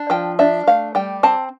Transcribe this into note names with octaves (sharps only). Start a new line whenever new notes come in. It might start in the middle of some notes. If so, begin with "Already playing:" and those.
Already playing: D4
F3 G5
D4 E5
A3 F5
G3 G5
C4 A5